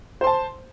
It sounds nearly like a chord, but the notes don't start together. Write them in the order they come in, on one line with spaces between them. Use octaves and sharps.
C5 C6 A5